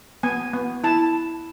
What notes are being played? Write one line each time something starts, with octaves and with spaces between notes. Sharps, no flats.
B3 G#5
B3
E4 A5